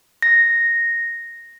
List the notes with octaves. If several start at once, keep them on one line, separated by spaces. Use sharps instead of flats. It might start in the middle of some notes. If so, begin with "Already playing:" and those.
A#6